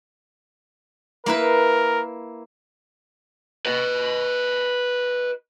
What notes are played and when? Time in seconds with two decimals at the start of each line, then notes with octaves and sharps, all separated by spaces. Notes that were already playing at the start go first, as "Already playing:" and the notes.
1.26 A#3 E4 A#4 B4
3.66 B4 D#5